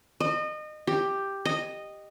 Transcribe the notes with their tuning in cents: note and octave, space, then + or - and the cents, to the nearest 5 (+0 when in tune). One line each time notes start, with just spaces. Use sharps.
D#5 -30
G4 +5
D#5 -10